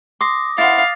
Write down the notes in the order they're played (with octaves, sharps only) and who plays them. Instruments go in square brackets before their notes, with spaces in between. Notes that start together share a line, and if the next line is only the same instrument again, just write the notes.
[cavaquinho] C6 [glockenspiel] D6 D#6 A#6
[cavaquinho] E4 C5 F#5 [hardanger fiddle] F5 [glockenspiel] A6